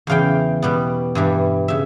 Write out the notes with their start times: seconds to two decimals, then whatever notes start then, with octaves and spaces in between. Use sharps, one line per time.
0.07 E2 C#3 E3 F5 G5
0.62 B2 G3 B3
1.15 G2 E3 G3
1.68 C#3 E5